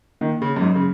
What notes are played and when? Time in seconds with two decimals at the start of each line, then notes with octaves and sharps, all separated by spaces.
0.21 D#3 A#3
0.41 C#3 C#4
0.56 F#2
0.61 G#2 F#3
0.75 C#3